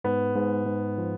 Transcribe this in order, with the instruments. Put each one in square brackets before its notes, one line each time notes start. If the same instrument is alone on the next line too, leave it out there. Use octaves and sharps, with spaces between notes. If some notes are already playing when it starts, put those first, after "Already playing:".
[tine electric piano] G#2 [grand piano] B3
[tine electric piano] G#2
G#2
F3